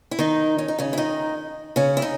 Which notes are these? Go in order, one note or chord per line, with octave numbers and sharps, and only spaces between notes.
E4
D#3 D#4
C#4
D#4
C#3 C#4
E4
D#3 D#4
C#3 C#4
E4
D#4